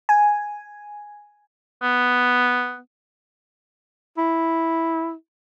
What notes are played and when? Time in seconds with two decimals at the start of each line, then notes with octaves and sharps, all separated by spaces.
0.09 G#5
1.83 B3
4.18 E4